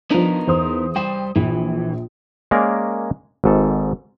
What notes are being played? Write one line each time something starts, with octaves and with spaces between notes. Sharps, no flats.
F3 B3 D4 D#4 A#4
E2 C5 D#6
G3 C5 G5
A#1 E3
G#3 A#3 C#4 A#4 D5
G#1 G#2 A4